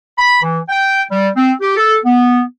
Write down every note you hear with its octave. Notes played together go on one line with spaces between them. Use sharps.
B5
E3
G5
G3
C4
G4
A4
B3